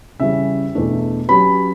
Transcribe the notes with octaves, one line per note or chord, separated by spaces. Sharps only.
C#3 E3 G3 C#4 E5
E2 B2 A3 D4
F#3 C#4 G4 B4 B5